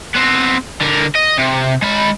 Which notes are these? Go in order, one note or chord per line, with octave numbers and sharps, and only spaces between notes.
B3 C4
D3 A#4
D#5
C3
G#3 B5